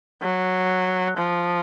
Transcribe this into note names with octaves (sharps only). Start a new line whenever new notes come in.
F#3
F3